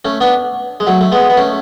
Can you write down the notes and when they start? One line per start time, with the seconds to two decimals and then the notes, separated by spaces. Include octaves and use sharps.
0.05 A3 C#4
0.20 B3 D4
0.80 G#3
0.87 F#3 A3
1.01 A3
1.12 G#3 B3
1.30 B3
1.37 A3 C#4